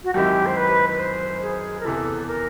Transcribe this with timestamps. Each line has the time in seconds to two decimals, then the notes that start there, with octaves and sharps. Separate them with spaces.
0.04 F#4
0.14 F#2 D#3 G#3 C4 E4 G4
0.46 C5
0.57 B4
0.89 B4
0.99 C5
1.42 G#4
1.80 A#4
1.85 E2 C3 E3 A4
2.27 A#4